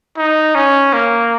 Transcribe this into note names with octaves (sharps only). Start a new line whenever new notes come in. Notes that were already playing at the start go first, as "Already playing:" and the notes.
D#4
C#4
A#3